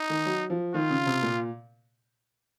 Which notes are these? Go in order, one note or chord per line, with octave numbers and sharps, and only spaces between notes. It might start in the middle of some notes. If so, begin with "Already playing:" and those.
Already playing: D#4
D#3
F#3
F3
D#3 F4
C#3
C3
A#2